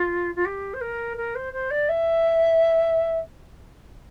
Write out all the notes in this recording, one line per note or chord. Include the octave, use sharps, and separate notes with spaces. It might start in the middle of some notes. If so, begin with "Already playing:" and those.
Already playing: F4
F4
G4
C5
A#4
A#4
C5
C5
D5
E5